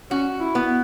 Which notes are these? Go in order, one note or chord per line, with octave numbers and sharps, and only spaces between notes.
C#4 F#4
E4
B3